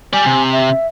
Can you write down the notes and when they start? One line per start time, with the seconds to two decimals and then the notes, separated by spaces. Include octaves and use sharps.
0.13 G3 D5 G#5
0.26 C3
0.52 E5